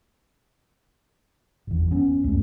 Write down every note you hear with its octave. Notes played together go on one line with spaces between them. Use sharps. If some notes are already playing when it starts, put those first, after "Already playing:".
G1 E2
B3 C#4
C#2 F#2 A3